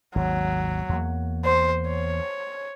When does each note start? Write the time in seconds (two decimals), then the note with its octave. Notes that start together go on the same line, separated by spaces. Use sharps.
0.15 G#1 D#2 F#3
0.89 E2 A#3
1.45 C5
1.88 C#5